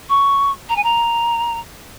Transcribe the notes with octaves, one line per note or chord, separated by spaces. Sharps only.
C#6
A#5
G#5
A#5